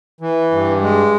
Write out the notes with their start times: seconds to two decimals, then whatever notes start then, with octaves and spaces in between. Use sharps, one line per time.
0.21 E3
0.51 G2
0.82 G#3